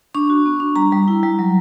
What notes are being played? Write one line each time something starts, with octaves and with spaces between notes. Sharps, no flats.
D4 C#6
F#4
B3
D4
G3 A#5
G3
E4
G3
F#3